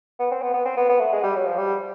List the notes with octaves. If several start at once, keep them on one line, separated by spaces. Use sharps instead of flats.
B3
C4
B3
B3
C4
B3
B3
A3
G#3
G3
F#3
F3
G3